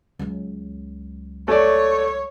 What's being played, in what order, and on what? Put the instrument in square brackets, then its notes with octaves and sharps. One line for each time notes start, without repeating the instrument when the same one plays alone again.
[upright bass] C#2 F#3
[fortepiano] A3 D5 [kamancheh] C#5